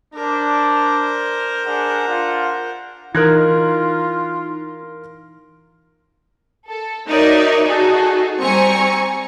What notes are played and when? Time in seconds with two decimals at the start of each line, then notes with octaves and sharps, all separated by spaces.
0.14 D4 A#4 C5
1.65 D4 G#4 F#5
2.07 D4 F4 F#5
3.15 E3 D#4 F4 A#4 F#6 G#6
6.70 A4
7.09 D#4 F#4 A#4 C#5 D5 E5
7.66 D#4 F#4 G#4 A4
8.39 G3 C4 G#5 A#5 C#6 C#7